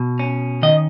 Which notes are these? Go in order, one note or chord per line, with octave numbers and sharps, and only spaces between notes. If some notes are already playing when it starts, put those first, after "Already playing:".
Already playing: B2
C#4
D#3 D#5